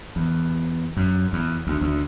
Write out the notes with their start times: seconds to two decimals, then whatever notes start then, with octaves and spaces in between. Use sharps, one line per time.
0.16 E2
0.97 F#2
1.33 E2
1.67 D2
1.81 D2